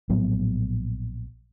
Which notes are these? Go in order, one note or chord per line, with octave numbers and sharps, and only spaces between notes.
A#1 A2 F#3 B3